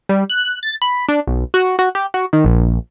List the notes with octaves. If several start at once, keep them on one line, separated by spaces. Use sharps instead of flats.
G3
F#6
A6
B5
D4
B1
F#4
F#4
G4
F#4
D#3
A#1